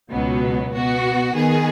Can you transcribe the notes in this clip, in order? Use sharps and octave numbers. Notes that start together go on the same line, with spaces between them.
C#2 B2 F#3 B3
B2 B3 F#4
D#3 B3 G#4